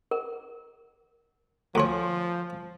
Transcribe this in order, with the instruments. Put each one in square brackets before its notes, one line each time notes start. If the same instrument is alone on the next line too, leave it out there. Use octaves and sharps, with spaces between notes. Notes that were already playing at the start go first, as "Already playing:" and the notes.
[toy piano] A#4
[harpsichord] D2 C#5 [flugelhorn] F3 [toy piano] G#5 C6